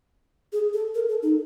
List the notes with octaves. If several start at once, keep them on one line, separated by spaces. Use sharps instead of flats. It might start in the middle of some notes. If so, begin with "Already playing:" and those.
G#4
A4
A#4
A4
D#4